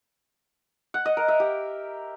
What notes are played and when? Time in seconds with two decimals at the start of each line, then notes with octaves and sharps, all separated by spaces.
0.94 F#5
1.06 D#5
1.17 A#4
1.28 E5
1.40 G4